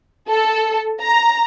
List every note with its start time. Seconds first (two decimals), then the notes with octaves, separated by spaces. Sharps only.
0.29 A4
1.02 A#5